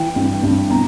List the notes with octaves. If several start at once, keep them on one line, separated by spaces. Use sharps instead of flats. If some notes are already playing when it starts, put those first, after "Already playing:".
Already playing: E3 G5
G2
G2
B2 A#5